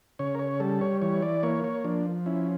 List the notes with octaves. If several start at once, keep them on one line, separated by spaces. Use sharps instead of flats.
C#3 C#5
A#4
C#5
G3 A4
C#5
E3 C#5
D5
A#3 C#5
C#5
F3 D4
C#4 E4